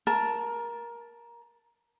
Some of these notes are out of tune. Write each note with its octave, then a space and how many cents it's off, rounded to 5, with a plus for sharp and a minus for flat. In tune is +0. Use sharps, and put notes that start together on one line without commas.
A#4 +15 A5 +0